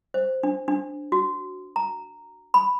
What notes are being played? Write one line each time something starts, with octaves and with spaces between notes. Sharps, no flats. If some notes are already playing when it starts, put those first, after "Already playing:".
C5
D4
D4
F#4
A#5
B5